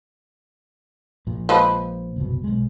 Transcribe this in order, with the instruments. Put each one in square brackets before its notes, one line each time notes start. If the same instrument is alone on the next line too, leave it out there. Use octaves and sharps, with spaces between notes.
[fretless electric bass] A#1 A#2
[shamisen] F3 G#3 B4
[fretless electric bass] F#1 C2 B2
B1 G#3